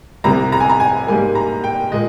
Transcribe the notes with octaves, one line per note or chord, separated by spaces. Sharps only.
C2 C3 G3 A#5
A#5
G#5
A#5
G#5
G#2 G3 A#3 G#5
A#5
G5
A#2 G#3 D#5